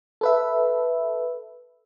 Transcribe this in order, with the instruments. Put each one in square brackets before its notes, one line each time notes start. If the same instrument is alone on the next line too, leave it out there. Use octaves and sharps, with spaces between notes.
[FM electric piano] A4 B4 E5